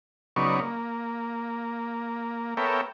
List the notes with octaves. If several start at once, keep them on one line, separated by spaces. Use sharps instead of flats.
C#3 F#3 B3 D#4 D5 C#6
A#3
B3 A4 A#4 C#5 E5 G5